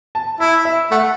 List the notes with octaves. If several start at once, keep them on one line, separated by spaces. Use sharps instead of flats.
A5
E4 B5
E5
A3 F#5